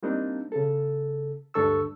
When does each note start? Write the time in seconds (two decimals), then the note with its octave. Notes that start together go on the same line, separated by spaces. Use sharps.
0.03 G3 A#3 C4 D4 D#4
0.52 C#3 A4
1.54 D2 G2 D4 A4 C#6 E6